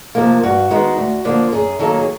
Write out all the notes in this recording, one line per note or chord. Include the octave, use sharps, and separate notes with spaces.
C3 F3 A#3
G2 F#4
D#3 G#3 B3
D2
D3 F3 A#3
F#2 G#4
D#3 F#3 A#3 A4
G#4